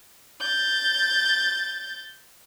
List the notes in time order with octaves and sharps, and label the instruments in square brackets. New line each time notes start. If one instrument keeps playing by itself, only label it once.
[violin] G6 A6